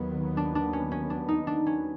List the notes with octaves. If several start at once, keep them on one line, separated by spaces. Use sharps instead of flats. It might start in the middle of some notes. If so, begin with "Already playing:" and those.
Already playing: D#2 D#3 F#3 B3
D4
D4
C#4
C#4
D4
D#4
D4
C#4